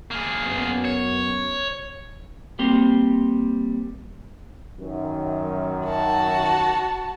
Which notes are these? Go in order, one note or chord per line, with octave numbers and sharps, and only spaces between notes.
A#3 G#4
F#2 B3
C#5
G3 A#3 C4 G4 C6
F#2 D#3
F#4 A5